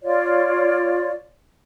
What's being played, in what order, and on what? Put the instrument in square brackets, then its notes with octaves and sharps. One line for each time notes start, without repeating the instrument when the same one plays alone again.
[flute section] F4 C#5 D5